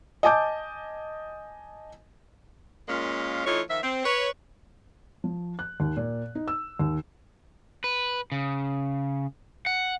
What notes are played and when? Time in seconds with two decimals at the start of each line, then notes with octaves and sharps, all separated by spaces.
0.23 D#5 G#5 A5 D6 G6
2.89 A#2 G#3 A#3 C#4 F4
3.46 E3 A3 D#4 F4 C#5
3.70 D#3 F3 E5
3.83 C4
4.04 B4 C#5
5.24 F3
5.59 F#6
5.80 D#2
5.97 A#2
6.35 D#4
6.48 E6
6.79 D#2
7.84 B4
8.32 C#3
9.66 F#5